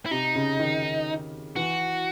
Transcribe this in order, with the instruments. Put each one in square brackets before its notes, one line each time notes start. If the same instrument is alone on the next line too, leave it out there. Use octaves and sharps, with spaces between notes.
[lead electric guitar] E4
[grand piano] C3 [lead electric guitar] D#4
[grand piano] C#3
D#3
[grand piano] E3 [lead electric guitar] F#4